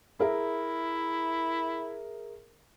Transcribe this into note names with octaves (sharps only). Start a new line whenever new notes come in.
E4 G#4 A#4 E5